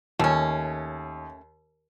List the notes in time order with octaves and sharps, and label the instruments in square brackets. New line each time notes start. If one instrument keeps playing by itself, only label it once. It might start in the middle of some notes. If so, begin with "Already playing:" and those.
[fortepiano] D#2 [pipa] A3 C#4